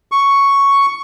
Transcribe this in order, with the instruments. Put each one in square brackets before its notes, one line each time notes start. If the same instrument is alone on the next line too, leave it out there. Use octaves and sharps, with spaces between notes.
[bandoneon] C#6